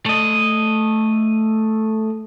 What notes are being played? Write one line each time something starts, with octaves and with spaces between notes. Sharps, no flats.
A3 D#5